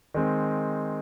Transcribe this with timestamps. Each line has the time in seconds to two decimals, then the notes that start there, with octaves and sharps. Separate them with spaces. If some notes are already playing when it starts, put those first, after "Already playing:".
0.14 D#3 G#3 C4